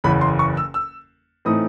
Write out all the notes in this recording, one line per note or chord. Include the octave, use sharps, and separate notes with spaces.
F#1 E2 C#3 E3 B5
C6
C#6
E6
E6
A2 E3 A3 C4 D#4 D#6